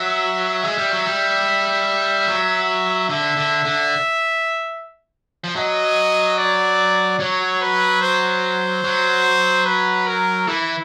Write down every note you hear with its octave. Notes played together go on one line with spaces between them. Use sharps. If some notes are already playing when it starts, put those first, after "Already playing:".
Already playing: F#3 E5
G#3 E5
G3
F#3
G3
F#3
D3 E5
D3
D3
F3
F#3 D#5
D5
F#3 C#5
B4
C5
F#3
B4
A#4
E3 E4